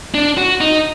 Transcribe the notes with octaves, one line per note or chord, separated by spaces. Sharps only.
D4
F#4
D#4